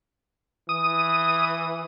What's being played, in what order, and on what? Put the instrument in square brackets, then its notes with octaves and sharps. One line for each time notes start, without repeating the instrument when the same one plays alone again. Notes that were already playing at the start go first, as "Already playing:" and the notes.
[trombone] E3 [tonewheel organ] D#6